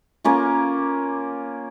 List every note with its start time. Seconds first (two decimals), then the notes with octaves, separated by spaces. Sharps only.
0.24 A#3 C#4 F4